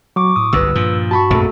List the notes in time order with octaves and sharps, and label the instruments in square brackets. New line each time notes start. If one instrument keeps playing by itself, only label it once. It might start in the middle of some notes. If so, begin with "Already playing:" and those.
[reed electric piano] F#3 [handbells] C#6 D6
[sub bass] A2 [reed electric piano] D#6
[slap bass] G1 F#2 [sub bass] C2 [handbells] B4 E6
[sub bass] G2 [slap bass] A#2 F3
[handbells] F#4 [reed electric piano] A5 B5 C#6
[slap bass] A#1 F2 A#2 [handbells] A3 A4